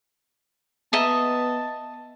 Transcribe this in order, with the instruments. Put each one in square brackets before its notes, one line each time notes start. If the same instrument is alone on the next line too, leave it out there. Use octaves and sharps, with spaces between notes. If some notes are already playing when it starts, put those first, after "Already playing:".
[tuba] B3 [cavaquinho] D#5 E5 A#5 [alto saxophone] A5